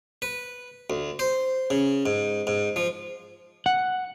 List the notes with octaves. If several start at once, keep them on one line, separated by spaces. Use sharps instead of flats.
B4
D2
C5
C#3
G#2
G#2
F3
F#5